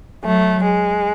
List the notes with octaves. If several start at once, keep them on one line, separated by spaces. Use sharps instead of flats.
F#3 A3
G#3